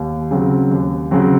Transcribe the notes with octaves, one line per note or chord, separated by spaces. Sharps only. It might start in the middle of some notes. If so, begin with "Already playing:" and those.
Already playing: D#2
C#3 F#3 C4
D#2
C#3 F#3 C4